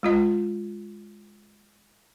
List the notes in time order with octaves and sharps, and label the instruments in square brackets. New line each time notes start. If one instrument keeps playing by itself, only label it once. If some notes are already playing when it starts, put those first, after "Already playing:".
[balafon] G#3 F4 D#5